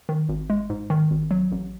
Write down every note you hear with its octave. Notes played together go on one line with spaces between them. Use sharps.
D#3
G#1
G#3
G#2
D#3
G#1
F#3
A1